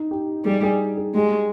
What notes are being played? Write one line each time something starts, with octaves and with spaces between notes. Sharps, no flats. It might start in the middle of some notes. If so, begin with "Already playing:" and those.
Already playing: D#4
G4
G3 G#4
G#4
G#4
G#3 G4